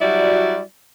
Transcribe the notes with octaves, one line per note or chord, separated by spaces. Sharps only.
F#3 G3 E4 F#4 D5